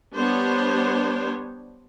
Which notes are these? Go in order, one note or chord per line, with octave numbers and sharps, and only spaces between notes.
G3 B3 D4 G4 C5 C#5